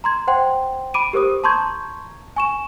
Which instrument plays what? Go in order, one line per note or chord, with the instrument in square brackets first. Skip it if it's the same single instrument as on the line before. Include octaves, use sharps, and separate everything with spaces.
[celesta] A#5 C6 G#6
C5 F#5 G5 C6
B5 D6 D7 D#7
G4 A#4 C5 D6 D#6
A5 A#5 C6 C#6 G6 G#6
G#5 C#6 E7